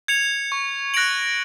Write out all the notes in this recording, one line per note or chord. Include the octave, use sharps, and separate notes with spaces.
G#6 C#7 F7
C#6
F#6 A#6 D7 F#7